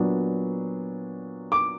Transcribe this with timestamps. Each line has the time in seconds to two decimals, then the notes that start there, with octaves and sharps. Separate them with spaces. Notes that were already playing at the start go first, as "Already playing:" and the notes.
Already playing: A#2 F#3 B3 D4
1.52 D6